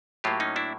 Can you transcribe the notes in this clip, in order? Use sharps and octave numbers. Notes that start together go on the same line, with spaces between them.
A2 F#3 A#3 F4 G4
C#4 D#4
D4 E4